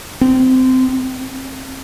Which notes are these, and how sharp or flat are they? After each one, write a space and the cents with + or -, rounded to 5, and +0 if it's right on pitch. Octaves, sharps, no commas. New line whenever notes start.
C4 -20
C4 +30